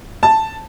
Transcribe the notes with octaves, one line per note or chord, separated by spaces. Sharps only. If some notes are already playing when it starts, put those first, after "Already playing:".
A5